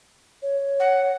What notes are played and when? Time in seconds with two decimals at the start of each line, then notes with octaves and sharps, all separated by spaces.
0.42 C#5
0.80 F#5